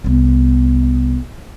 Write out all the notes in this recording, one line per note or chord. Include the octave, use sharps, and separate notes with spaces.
C2 B3